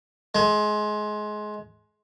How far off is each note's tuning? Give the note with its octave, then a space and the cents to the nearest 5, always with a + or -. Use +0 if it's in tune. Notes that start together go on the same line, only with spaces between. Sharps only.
G#3 +25